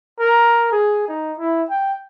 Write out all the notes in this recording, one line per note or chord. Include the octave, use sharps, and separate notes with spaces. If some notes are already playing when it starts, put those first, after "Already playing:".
A#4
G#4
D#4
E4
G5